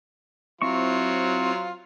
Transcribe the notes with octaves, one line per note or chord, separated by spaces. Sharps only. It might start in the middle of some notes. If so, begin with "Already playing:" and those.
F#3 C4 E4 F4 C5 C#6